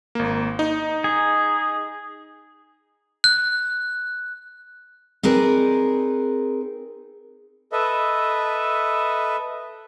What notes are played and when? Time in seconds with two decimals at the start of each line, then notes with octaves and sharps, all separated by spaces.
0.15 G#1 A#3
0.59 D#4
1.04 G#4
3.24 F#6
5.23 C4 D#4 G#4 A#4 B4 D5
7.72 A4 B4 D#5 E5